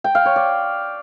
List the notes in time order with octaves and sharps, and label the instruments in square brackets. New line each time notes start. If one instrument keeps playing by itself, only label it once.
[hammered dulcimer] G5
F5
C#5
D5